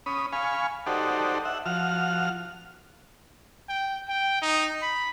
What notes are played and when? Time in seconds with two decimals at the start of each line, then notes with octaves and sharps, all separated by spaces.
0.06 C#4 B5 D#6
0.32 F5 G#5 B5 C#6
0.86 D#4 F#4 G4 A4 C5 D5
1.45 E5 F#5
1.66 F3 F#4 F6
3.69 G5
4.08 G5
4.42 D#4
4.82 B5